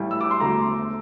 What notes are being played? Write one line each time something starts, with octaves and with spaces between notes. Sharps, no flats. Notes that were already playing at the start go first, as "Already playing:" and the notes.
Already playing: A1 A2 G3
E6
D6
C6
E1 D2 D3 A3 A#5